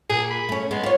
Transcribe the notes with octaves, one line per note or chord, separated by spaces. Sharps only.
A#2 G#4
B5
A3 C#4
G#3 B3
F4 C#5